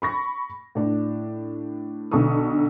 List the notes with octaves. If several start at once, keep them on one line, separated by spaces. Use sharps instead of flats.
B5 C#6 A#6
A2 D4
B1 D3 A4 C#6 D#6